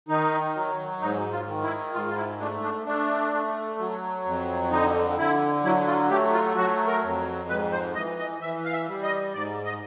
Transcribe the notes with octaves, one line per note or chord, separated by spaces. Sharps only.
D#3 D#4
F#3
G#2 D#4
F4
D#3
E4
G#2 F4
F4
E4
A3 D4
D4
A3 D4
A3
F#3
F2
D3 D#4
D3 E4
F#3 E4
F4
A3 G4
F4
F#3 F#4
A#4
F2
G#2 B4
C5
E3 D#5
D#5
E3 E5
F5
E5
G3
D#5
G#2 D5
D#5